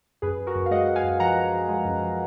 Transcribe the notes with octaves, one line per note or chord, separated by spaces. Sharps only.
F#2 G#4 B4
F#2
F#4 A#4
F#2
F5
G#3 D#5 F#5
F#2 F#5
F5 G#5
F#2
F3 F#5 A#5
F3
F3
G#3
F#2
F3